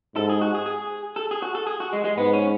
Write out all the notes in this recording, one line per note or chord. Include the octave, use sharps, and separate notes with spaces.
G#2 A4
G#4
F#4
G#4
G#4
A4
G#4
F#4
A4
G#4
F#4
G#3
G#3
G#2 B3
C#4